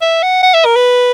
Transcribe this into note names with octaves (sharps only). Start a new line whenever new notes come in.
E5
F#5
F#5
E5
A#4
B4